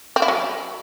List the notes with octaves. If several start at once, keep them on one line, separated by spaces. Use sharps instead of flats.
C4
E4
F#3